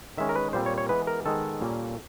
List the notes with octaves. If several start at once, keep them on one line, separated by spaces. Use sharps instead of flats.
D#3 G#3 C#4 E5
A#4
B4
A#2 G3 C4 C5
C#5
C#5
E3 G#3 B3 B4
A#4
D#3 G#3 B3 A4
A#2 G3 A#3 C#4